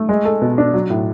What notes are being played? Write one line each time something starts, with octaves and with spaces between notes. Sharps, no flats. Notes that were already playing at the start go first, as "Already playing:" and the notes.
Already playing: A3
G#3
A4
B2
D4
F#3
A2